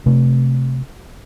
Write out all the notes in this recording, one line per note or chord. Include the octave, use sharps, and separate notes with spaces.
C3 A3